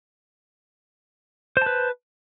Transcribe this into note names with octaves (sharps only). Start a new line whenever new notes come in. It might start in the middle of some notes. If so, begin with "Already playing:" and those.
B4 C5 A5